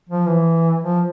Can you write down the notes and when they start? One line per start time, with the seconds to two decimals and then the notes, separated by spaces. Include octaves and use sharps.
0.09 F3
0.27 E3
0.84 F3